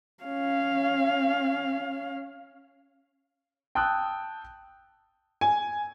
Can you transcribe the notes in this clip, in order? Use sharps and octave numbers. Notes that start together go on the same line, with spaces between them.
C#4 F5
G5 A5 D#6 E6 F#6
G#5